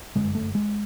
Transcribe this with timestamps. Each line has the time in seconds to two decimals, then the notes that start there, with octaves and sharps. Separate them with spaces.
0.16 G1 F#2 D3 G#3
0.35 A3
0.55 G#3